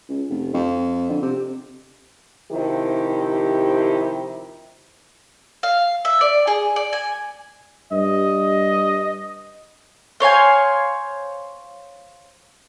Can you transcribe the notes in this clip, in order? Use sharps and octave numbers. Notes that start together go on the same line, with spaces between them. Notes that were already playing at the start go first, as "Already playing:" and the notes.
C#2
F1
F2
D3
C3
C3 D#3 F3 E4 G4
F5
E5
D5
G#4
D5
G#5
G2 D#5
C5 C#5 F5 G#5